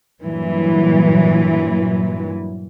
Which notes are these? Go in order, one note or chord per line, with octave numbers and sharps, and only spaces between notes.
G2 A#2 E3 F#3